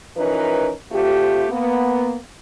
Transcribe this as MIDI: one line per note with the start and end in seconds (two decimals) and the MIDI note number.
0.17 0.71 52
0.17 0.71 53
0.17 0.71 61
0.17 0.71 63
0.17 0.71 70
0.17 0.71 71
0.92 1.45 38
0.92 1.45 48
0.92 1.45 57
0.92 1.45 65
0.92 1.45 67
1.50 2.17 58
1.50 2.17 59